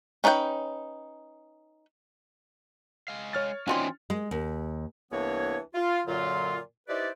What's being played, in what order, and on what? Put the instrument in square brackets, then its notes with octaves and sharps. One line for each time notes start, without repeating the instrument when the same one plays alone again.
[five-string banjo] C#4 D#4 B4 D5 G5
[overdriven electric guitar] G#3 F5
[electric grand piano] C#5 F6 A6
[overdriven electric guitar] E3 G#5 [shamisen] C4 F4 F#4 [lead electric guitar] C#4 D#4
[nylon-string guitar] G#3
D#2
[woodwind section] C2 E3 A#3 B3 D4 C#5
F4
F#2 A#2 D3 F#3 F4
D#4 E4 G4 B4 C5 D5